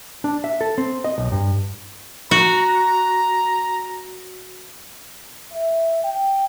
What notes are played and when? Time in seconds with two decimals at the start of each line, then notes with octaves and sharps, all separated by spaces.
0.24 D4
0.44 E5
0.61 A4
0.78 C4
1.04 D#5
1.18 B1
1.32 G2
2.31 F#4 A#5
5.51 E5
6.03 G5